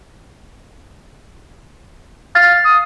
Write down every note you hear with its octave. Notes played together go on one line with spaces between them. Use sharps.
F5 A6
D#6